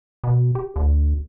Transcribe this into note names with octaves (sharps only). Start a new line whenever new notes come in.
B2
G4
D2